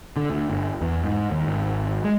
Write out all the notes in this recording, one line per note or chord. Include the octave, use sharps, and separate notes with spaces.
D3
D2
G1
E2
G#2
D#2
G#1
G#3